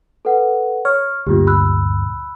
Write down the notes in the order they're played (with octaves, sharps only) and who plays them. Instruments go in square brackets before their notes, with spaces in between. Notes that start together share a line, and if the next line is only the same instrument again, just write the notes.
[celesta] A4 B4 F#5
[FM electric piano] C#5 [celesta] F6
[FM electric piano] D2 G2 A#2 [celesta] F4 G4
[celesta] B5 E6 F#6